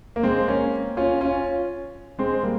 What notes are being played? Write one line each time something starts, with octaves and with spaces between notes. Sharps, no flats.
A#3
G#3 C4
A#3 C#4
C#4 F4
C#4 F4
G#3 C4
G3 A#3